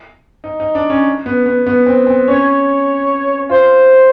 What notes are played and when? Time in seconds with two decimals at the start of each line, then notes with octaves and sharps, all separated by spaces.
0.44 D#4
0.60 D#4
0.75 D4
0.90 C#4
1.26 B3
1.46 B3
1.67 B3
1.86 C4
2.07 C4
2.28 C#4 C#5
3.49 F4 C5